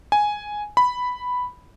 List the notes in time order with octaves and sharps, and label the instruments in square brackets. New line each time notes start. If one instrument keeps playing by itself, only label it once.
[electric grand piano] G#5
B5